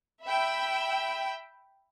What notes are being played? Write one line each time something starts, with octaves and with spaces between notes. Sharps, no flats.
E5 G5 B5 E6